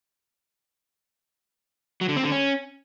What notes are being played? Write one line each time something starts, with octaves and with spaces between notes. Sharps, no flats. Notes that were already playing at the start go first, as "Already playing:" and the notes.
F#3
D3
C4
D3
C#4